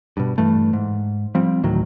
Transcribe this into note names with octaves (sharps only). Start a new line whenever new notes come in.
G2 B2
G2 E3 A3
G#2
F3 G3 C4
D2 A2 D#3 F#3